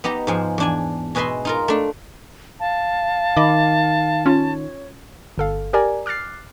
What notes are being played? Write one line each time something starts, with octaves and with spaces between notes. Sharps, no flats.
B3 D#4 G4 A#5
G#2 F3 G#4
E2 D4 G#5
B2 G#4 B4 D#5 E5 C6
D#4 F4 A#4
A3 D4
F5 A5
D#3 D#5 B5 D6
C#4 F4 C#5
G1 A4 F5
G4 A#4 D5 G#5 A#5
D6 F6 F#6 A6 C7